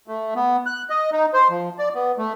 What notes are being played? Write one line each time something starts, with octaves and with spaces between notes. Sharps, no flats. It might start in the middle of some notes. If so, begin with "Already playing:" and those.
A3
B3
F#6
D#5
D#4
C5
F3
D5
B3
A3